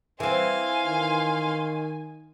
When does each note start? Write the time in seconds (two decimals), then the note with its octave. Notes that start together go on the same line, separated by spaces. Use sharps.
0.20 E3 C4 F5 G#5 C6
0.87 D#3